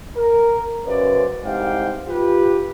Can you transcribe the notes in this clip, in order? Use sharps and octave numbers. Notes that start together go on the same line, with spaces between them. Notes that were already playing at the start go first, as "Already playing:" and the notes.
A#4
F#2 C#3 B4 C5 D5
C2 G#2 C3 G4 F5 G5
F4 G4 B4